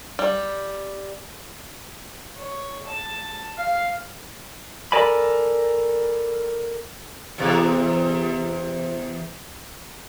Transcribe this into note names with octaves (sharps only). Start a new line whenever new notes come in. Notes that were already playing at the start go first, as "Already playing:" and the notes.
G3
C#5
A5
F5
A4 A#4 D5 G#5 B5
E2 C3